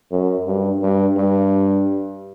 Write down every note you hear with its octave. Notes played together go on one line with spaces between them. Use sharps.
F#2
G2
G2
G2